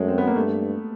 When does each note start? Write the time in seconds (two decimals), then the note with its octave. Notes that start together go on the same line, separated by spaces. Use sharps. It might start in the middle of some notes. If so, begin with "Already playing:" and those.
Already playing: F#2 G#3 A3
0.08 C4
0.18 B3
0.27 A#3
0.36 G2 A3